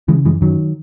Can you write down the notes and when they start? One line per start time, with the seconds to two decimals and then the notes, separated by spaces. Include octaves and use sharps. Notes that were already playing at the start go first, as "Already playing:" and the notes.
0.08 C#3 E3 G#3
0.25 F#2 E3 G#3
0.41 F#2 D#3 F#3